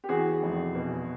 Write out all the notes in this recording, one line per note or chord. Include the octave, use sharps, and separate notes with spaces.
G4
E2 F#4 G#4
F1
B2